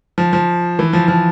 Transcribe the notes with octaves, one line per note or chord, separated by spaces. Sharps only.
F3
F3
E3
F3
F3